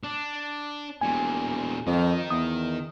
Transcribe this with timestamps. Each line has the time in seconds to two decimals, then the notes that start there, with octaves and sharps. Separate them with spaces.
0.04 D4
1.01 E1 A#2 G3 G#5
1.87 F2 D#3
2.30 E2 D#6